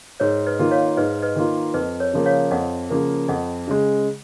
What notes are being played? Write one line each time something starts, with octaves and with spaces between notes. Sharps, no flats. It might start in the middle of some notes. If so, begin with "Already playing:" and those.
G#2 A#4 C#5
B4 D#5
D#3 A#3 F4
C#5 F5
G#2 B4 D#5
B4 D#5
D#3 A#3 F4
F2 B4 D#5
A#4 C#5
C#3 F3 A#3
C#5 F5
F2 D#5 F#5
C#3 F3 A#3
F2 D#5 F#5
C#3 G#3